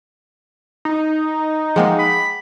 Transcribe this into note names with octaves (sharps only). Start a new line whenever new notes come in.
D#4
F3 G#3 A#3 G#4 F#5 G5
B5